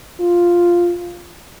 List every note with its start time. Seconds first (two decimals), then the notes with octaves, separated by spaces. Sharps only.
0.21 F4